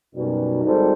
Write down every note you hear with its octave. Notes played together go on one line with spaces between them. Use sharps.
F#2 B2 G3 D#4
G#1 G3 D#4 A4 C5